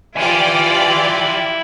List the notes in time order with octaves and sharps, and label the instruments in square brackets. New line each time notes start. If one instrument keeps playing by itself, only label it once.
[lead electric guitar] E4 G#5 [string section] F4 G4 D5